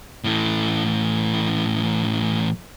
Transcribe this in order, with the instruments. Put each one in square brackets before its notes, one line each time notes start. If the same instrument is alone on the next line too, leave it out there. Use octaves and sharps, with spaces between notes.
[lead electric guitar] A2 E3